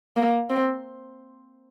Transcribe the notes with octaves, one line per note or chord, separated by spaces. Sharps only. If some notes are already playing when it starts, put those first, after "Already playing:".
A#3
C4